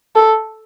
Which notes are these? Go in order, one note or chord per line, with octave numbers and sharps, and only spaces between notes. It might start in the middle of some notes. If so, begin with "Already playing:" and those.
A4